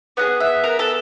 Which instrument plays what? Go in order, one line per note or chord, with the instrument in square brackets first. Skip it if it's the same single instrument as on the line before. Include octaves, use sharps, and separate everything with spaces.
[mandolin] B3 D#4 G#4 F#5
E5
A#4
A4